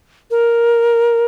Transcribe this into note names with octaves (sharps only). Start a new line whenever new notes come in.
A#4